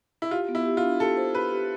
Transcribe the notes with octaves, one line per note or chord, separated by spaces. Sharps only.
E4
F4 G4
B3
E4
G4
F4
D4
G4 A4
C5
G4 B4
G4